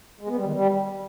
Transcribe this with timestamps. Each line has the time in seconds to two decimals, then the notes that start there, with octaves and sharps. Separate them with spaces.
0.21 G#3
0.29 B3
0.37 G3
0.45 D#3
0.53 G3